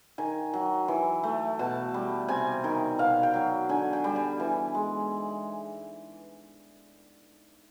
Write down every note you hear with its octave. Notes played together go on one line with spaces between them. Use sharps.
D#3 G#5
F#3
E3
A3
B2 A5
G3
C3 G#5
D#3
B2 F5
G5
F#3
D3 G#5
G5
G3
G#5
E3 G#5
G#3